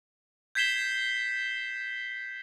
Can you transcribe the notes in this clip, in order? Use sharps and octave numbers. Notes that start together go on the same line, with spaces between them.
G6 G#6 B6 C7 E7 G7